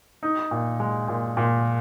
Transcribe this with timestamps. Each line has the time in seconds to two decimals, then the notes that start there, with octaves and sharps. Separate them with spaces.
0.23 D#4
0.51 A#2
0.80 G#3
1.08 A#2
1.37 A#2